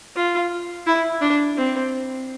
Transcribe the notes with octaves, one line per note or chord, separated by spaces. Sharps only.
F4
E4
D4
C4